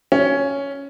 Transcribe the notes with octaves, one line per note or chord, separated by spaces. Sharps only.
C#4